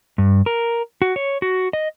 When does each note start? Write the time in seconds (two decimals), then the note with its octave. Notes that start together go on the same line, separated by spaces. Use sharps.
0.18 G2
0.46 A#4
1.02 F#4
1.16 C#5
1.42 F#4
1.73 D#5